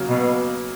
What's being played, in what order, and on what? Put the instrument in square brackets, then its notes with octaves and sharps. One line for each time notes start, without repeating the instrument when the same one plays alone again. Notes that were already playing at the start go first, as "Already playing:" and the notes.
Already playing: [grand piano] C#3 F#3 A#3
[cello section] B2 B3